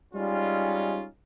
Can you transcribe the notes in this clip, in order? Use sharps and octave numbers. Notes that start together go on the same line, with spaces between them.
G3 G#3 C#4 D#4 F4